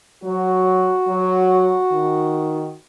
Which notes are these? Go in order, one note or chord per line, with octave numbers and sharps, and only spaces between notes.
F#3 F#4
F#3
D#3